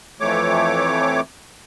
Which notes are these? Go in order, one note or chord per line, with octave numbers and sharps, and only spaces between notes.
F2 E3 A3 C#5 D6